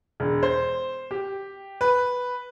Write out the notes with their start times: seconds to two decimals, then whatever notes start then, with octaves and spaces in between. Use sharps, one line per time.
0.20 E1
0.43 C5
1.11 G4
1.81 B4